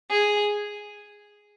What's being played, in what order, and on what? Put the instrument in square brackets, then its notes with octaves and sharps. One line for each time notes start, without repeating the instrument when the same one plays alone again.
[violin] G#4